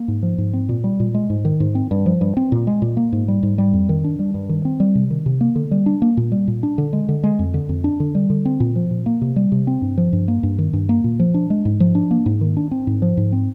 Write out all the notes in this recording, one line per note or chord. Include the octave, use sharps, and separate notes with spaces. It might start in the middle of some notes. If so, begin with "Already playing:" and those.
Already playing: A#3
G#2
F3
G#2
C4
A#2
G3
A#2
G#3
G#2
D#3
G#2
C4
G2
F3
G2
C4
A#2
G#3
A#2
A#3
G#2
G3
G#2
G3
F2
D#3
D4
G3
G2
D#3
C4
G3
C3
D#3
C3
A#3
D3
G3
D4
A#3
A#2
G3
A#2
D4
D3
G#3
D3
G#3
F2
D3
F2
D4
D3
G3
D3
C4
A#2
F3
A#2
A#3
C3
G3
C3
C4
G2
F3
G2
A#3
G2
D#3
G2
A#3
A#2
F3
D4
G#3
G#2
F3
D4
A#3
G#2
D#3
D4
C4
G#2
F3
G#2
C4